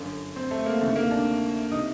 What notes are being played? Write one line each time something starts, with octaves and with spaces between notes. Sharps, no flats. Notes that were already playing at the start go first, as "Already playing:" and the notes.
Already playing: G1 F#2 D3
C4
A3
A#3
D2 C3 D#3 A3
A#3
D4
C3 D#3 D#4